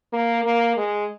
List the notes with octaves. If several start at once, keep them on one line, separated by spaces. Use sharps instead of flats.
A#3
A#3
G#3